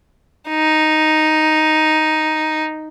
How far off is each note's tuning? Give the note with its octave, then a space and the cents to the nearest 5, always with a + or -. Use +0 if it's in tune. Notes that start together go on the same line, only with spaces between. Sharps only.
D#4 +0